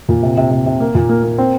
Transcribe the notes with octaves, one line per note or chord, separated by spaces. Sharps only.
A#2
C3
C3
C3
C3
A#3
A#2
A#3
A#3
C4